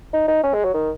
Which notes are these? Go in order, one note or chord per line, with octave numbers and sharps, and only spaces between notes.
D#4
D#4
C#4
G#3
F#3
D#3